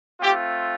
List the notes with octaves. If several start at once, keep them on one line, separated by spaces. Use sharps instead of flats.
A3 C4 F4 G4